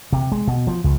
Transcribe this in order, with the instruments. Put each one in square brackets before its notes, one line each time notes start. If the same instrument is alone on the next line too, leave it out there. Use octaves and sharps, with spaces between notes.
[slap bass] C3
G#3
B2
F3
C#2